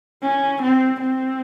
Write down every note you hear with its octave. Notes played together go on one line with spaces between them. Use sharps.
C#4
C4
C4